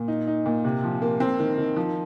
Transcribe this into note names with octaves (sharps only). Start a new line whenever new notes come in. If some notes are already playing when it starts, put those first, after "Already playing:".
Already playing: A#2
D#4
D#4
A#2
C3
F3
A#3
C4
D#3
D#3
F3